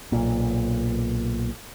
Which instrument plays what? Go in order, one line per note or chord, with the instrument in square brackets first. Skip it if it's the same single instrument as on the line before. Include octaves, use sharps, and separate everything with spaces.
[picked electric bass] B1 A#2